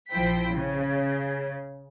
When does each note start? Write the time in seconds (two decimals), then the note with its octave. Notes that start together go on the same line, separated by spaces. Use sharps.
0.12 A#1 F3 E4 C5 G5 B6
0.52 C#3